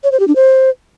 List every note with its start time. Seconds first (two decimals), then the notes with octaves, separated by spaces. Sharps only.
0.04 C#5
0.12 C5
0.20 G4
0.28 D4
0.36 C5